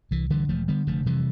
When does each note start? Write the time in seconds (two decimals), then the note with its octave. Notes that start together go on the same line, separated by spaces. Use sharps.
0.11 C2 E3
0.30 D3 E3 G3
0.49 E1 F3 A3
0.68 D3 G3 B3
0.87 F1 F3 A3
1.06 C3 E3 G3